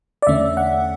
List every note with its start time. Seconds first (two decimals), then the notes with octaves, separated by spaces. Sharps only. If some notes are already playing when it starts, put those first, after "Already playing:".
0.22 D5
0.27 E2 D3 A3 C#4 E5
0.57 F#5